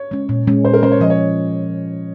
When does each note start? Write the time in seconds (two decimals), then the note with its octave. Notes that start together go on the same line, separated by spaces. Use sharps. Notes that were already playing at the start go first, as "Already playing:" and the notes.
Already playing: C#5
0.11 G#3 C#4
0.29 A#2
0.47 G#3 C#4
0.65 A#2 C5
0.73 A#4
0.83 G#3 C#4 C5
0.92 C#5
1.01 F3 D#5
1.10 C#5